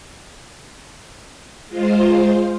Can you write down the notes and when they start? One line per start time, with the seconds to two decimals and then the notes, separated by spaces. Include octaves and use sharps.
1.68 G#3 F4 C5